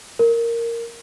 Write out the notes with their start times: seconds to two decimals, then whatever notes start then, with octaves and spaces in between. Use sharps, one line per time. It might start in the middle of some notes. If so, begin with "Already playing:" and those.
0.19 A#4